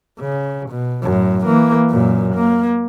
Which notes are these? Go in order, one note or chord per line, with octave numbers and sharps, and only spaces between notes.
C#3
B2
F#2 A2
E3 A#3
F#2 A#2
A#3